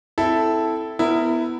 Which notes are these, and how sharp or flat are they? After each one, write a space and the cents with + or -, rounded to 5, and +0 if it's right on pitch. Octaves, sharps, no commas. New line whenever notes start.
C4 -10 E4 +0 A4 -5
B3 +15 E4 +0 A#4 -25